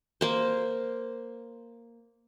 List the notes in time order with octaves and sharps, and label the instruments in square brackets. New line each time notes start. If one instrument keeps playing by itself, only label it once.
[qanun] A#3 C5